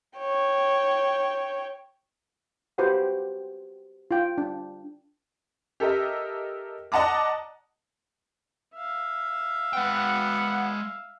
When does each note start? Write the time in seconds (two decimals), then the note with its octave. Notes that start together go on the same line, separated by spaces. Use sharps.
0.19 C#5 G5
2.78 F#4 G4 B4 C5 F#5 G5
4.11 F4 G5
4.38 D4
5.80 G4 A4 A#4 D#5 E5
6.92 D5 D#5 F#5 A5 A#5 D6
8.75 E5 F5
9.73 G#3 B3 F#5 G5